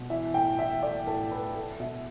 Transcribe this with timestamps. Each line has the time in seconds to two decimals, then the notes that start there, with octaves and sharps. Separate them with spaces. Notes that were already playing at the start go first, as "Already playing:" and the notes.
Already playing: B2
0.10 E3 E5
0.34 A2 G5
0.58 E3 E5
0.83 A3 D5
1.07 A2 A4
1.32 A2 B4
1.55 A3
1.80 B2 E5